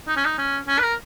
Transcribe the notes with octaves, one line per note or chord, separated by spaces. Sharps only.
D#4
C#4
D#4
C#4
C#4
B4
A#4